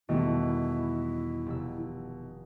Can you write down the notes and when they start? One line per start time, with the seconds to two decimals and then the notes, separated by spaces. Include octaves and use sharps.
0.09 E2 B2 D#3 G3 A3 E4
1.46 F1 E6